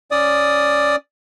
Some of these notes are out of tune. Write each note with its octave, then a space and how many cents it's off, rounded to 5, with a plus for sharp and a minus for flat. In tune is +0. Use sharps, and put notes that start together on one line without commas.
C#4 +0 D5 +5 D#6 +0